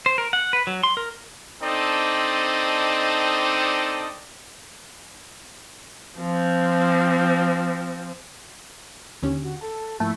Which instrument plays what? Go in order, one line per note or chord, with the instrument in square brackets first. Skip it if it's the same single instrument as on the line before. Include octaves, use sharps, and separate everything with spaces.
[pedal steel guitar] C5
A#4
F#5
B4
F#3
C6
A#4
[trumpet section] C4 D4 D#4 A4 D5 D#5
[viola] F3 C4
[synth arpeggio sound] D#2 C#4 [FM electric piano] D3 G4
[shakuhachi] F#4
[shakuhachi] A4 [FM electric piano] A5
[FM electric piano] G#2 F3 A#3 [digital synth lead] A3 [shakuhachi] E4